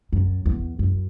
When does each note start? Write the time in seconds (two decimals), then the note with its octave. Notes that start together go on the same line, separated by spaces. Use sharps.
0.13 F#2
0.46 E2
0.79 F#2